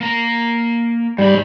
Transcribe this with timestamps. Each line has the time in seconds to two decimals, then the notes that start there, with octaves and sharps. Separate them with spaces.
0.01 A#3 A#5
1.18 G#2 G3 B5